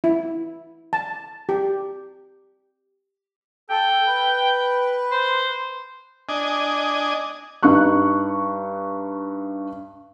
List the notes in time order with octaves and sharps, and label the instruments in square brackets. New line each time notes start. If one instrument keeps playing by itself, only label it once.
[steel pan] E4
A5
G4
[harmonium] A4 [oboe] G5
[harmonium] B4
[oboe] C5
[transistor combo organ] D4 D#5 G#5
[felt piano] G2 D#4 C#6 F#6